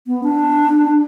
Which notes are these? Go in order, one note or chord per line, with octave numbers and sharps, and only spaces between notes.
B3
D4